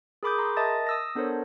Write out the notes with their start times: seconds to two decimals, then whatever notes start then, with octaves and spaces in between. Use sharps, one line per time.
0.23 G#4 A#4 B5 D6 D#6 G6
0.38 G#4 A#5 C6
0.57 A#4 D#5 E5 A5 D#6 A6
0.87 D#6 E6 A#6
1.15 B3 D4 A4 A#4 C5 C#5